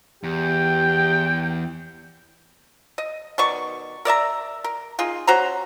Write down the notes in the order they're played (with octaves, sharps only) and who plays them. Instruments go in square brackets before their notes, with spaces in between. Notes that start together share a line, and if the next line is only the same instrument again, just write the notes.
[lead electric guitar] E2 [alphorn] G4 [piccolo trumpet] G5
[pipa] D#5
B2 D#3 D5 C#6
A#4 D5 E5 A#5
A#4
D#4 F4 G#4
C#4 F#4 C5 A#5